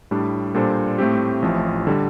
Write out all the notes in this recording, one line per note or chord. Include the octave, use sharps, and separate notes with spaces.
A2 G3 D4
A#2 G3 D4 A4 C5
A2 A3 C4 G4
A1 A2 F3 A3
D3 G3